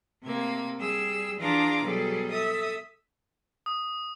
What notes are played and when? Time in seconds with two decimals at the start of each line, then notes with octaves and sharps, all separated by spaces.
0.23 C3 A3 A#3 G#6
0.77 G3 G#4 E6
1.39 E3 D4 F4 G#4 A#5 D6
1.83 B2 F#3 G3 G#4 A4
2.30 A4 E5 D#6
3.66 D#6